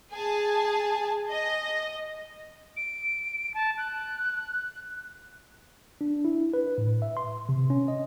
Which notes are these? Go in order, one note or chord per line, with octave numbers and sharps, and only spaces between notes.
G#4 G#5 A5
D#5
D7
A5
F#6
D4
E4
B4
A2
E5
C6
C3
C#4
D#5